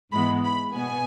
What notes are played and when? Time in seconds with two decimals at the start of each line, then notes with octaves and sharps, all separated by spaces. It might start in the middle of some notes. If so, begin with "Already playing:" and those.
0.11 G#2 E3 G#3 B3 B5
0.44 B5
0.75 B2 B3 G#5